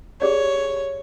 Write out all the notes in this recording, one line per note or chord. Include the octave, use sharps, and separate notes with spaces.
G4 G#4 C#5 D5